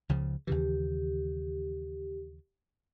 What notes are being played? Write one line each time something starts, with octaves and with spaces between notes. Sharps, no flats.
C#2 C#3 F3
D#2 C#3 E3 G4